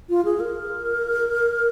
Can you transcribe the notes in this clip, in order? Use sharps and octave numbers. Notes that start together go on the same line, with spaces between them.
F4
G#4
A#4